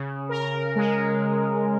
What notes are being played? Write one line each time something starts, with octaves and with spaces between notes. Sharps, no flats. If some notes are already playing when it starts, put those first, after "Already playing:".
Already playing: C#3
A#4
G#3